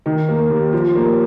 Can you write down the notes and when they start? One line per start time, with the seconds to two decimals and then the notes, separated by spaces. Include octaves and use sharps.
0.06 D#3
0.29 A#3
0.50 D#2
0.73 F3
0.95 A#3